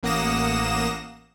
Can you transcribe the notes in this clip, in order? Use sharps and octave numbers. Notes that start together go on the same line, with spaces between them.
A1 A#3 F#5 D#6 A#6 E7